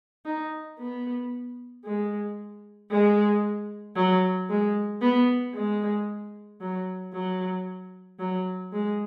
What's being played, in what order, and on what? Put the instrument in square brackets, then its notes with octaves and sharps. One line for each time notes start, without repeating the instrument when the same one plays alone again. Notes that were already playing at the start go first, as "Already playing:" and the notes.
[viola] D#4
B3
G#3
G#3
F#3
G#3
B3
G#3
F#3
F#3
F#3
G#3